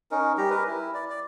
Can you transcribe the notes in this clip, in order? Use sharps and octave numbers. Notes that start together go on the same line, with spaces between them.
C#4 D#4 A#4
G3 G4 A#5
A#4 B4
E4
D5
D5